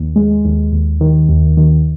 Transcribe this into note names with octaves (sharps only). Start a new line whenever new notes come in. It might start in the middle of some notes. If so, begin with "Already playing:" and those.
Already playing: D#2
G#3
D#2
D#2
D#3
D#2
D#3